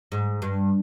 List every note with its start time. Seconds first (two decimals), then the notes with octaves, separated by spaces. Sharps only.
0.12 G#2
0.42 G2